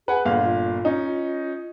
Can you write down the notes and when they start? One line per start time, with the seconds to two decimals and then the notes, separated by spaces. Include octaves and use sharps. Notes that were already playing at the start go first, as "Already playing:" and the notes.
0.08 G#4 B4 F#5 G#5
0.25 G1 A#2 F5
0.44 F4
0.85 C#4 D#4